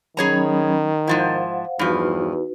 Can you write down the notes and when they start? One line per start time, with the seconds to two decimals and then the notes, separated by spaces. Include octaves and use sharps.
0.17 D#3 F#3 C#4 G#4 C#5 A#5 B5
1.07 G#2 F3 E4 C5 F5 F#5
1.79 E2 G2 F3 D#4 F#4 B4